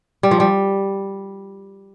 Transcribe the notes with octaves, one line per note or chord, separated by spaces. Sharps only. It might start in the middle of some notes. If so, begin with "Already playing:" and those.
G3
F3
G3